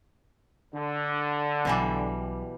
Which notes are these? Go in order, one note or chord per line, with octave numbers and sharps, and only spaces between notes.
D3
B1 B2 E3 G3